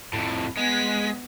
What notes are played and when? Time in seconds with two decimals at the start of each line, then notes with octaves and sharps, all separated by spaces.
0.13 F2 A2
0.57 G#3 B3 B6